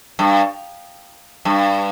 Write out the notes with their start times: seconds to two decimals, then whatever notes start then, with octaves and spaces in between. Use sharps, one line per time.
0.19 G2
1.45 G2